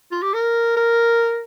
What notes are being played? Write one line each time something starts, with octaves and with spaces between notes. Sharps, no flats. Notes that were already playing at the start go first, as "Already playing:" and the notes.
F4
G4
A#4
A#4